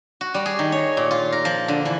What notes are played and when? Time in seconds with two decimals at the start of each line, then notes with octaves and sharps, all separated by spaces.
0.21 F#4
0.34 G3
0.46 G#4
0.59 D#3
0.72 C#5
0.97 A#2
1.11 F4
1.32 A#4
1.45 F3
1.68 D3
1.85 E3